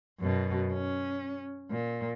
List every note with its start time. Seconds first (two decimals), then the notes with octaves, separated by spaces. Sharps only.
0.20 F#2 B2
0.72 C#4
1.71 A#2